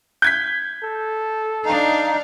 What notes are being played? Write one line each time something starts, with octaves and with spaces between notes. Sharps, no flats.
G6 G#6 B6
A4
D4 D#4 F5